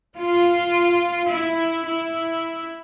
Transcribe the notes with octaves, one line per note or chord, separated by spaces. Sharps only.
F4
E4
E4